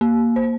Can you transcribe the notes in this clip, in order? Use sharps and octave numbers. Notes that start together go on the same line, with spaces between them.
A#3
C5